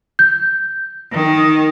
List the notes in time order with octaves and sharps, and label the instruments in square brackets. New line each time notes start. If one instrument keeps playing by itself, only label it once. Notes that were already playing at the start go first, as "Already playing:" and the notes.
[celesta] G6
[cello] D#3